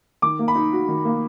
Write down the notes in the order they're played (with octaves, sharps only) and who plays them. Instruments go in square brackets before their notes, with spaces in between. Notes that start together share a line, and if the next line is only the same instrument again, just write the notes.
[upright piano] D#3 [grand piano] D6
[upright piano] A#3
[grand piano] B5
[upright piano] D#4
F#4
D#3
A#3